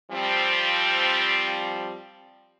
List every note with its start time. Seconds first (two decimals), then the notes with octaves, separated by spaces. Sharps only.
0.11 F3 G3 C4